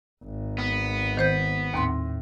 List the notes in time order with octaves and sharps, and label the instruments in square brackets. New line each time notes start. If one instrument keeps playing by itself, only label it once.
[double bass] G#1
[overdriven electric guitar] B3
[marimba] D#3 C5 G6
[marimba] D#2 C4 C6 [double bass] A2